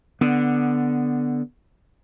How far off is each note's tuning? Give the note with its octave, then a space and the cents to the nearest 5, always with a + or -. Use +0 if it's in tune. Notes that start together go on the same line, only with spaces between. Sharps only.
D3 +0 B3 +0